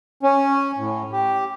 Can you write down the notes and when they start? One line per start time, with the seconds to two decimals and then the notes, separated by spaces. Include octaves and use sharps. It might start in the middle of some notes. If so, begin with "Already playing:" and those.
0.23 C#4
0.78 A2
1.12 G4